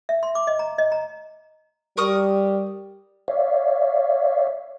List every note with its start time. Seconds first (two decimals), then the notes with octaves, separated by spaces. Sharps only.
0.09 E5
0.23 C6
0.35 D6
0.47 D#5
0.59 A#5
0.78 D#5
0.92 A#5
1.97 G3 A#4 C#6 D#6
3.28 C#5 D5 E5 F5